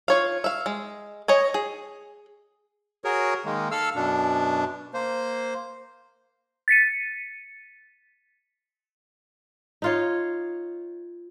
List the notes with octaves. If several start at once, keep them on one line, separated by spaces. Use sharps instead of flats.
F4 C#5 F5
E5 F5
G#3
C#5 D#5 G#5
G#4
F#4 G#4 A#4 C#5
D#3 G#3 A#3
A4 F5 E6 F6
F#2 B2 D4
A#3 C5
A6 B6 C#7 D#7
D#4 F4 C#5